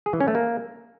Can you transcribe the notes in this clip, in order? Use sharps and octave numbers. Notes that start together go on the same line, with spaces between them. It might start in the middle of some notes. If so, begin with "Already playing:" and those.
G#4
E3
C#4
A3
A#3